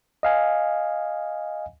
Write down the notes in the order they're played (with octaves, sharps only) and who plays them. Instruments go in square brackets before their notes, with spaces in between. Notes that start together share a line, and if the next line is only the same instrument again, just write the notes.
[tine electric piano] D#5 F5 G#5